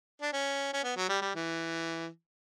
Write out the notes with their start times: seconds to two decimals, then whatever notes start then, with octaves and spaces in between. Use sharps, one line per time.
0.21 D4
0.33 C#4
0.73 C#4
0.84 B3
0.96 F#3
1.09 G3
1.22 G3
1.35 E3